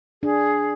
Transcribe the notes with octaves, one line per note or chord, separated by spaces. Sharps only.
D4 G#4